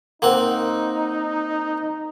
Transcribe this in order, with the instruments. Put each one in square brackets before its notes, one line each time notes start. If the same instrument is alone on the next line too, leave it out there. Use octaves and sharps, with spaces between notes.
[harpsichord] A#3 C4 F#5 [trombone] D#4